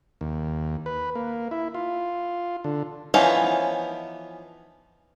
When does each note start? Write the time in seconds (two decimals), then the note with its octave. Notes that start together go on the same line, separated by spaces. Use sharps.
0.21 D#2
0.86 B4
1.15 A#3
1.51 E4
1.74 F4
2.64 D3
3.14 E3 F3 B3 C#4 D#4